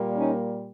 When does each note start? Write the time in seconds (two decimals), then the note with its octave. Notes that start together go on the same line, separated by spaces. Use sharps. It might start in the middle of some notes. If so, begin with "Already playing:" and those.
Already playing: A#2 G3 A#3
0.16 C#4 D#4